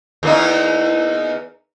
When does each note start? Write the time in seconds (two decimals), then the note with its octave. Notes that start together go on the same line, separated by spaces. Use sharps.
0.23 E2 A#3 D#4